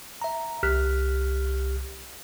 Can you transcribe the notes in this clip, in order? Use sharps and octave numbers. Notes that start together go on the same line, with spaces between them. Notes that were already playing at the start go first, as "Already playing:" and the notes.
E5 A#5
C2 G4 F6 F#6 B6